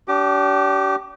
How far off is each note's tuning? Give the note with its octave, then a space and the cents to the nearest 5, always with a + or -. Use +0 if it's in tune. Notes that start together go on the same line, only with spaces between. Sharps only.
D4 -40 G4 -30 D6 +25